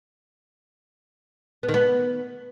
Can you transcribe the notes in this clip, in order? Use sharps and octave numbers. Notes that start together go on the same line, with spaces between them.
B3
D#3
B3